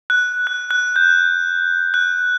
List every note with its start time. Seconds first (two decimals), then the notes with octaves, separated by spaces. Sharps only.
0.10 F#6
0.47 F#6
0.71 F#6
0.96 G6
1.94 F#6